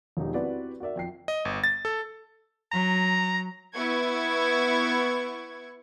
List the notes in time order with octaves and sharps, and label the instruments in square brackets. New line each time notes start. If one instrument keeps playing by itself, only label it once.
[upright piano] E1 F3 D#4 G4
C4 E4 F#4 G4 B4 D5
F#4 A#4 D5 E5
F2 G5 C7
[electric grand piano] D#5
G1
A6
A4
[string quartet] F#3 [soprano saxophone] A#5
[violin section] B3 E4 C#6 G#6